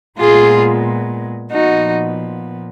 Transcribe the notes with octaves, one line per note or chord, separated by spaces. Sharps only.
A#2 G#3 B3 F4 G#4
A#2 F3 B3 D#4 F#4